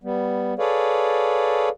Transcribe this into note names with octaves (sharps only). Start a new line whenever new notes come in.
G3 B3
G#4 A4 B4 C#5 D5 F5